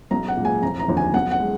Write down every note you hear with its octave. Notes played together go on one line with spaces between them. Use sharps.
B1 A#5
F#5
A#2 G#3
G#5
F1 A#5
A#5
D#2 D3 F3
G#5
B1 F#5
F#5
G#3